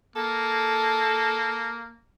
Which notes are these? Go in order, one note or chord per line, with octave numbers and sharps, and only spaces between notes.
A#3 A4